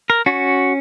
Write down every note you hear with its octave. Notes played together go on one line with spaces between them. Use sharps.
A#4
C#4 F#4